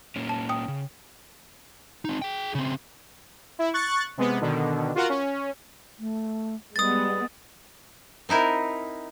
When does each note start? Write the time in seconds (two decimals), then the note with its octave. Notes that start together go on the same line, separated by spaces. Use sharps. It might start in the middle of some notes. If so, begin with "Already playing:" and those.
0.16 A#2 A#3 C#4
0.29 A5
0.49 G5 D#6
0.68 C#3
2.05 C4 D#4
2.22 G#4 G5
2.55 C#3 C4
3.59 E4
3.73 C#6 F#6 A6
4.18 C3 G#3 B3
4.41 B2 D3 D#3
4.95 F4 F#4 A#4 F#5
5.09 C#4
6.00 A3
6.76 G3 G#3 B3 D#6 A6
8.29 C4 D#4 E4 A#4